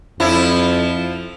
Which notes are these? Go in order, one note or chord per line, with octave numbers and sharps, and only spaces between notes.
F2 F3 E4